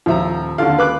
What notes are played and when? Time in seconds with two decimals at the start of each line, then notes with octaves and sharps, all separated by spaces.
0.06 D#1 F3 E5 A#5
0.58 D#2 D3 F4 F5
0.79 B4 D6 F#6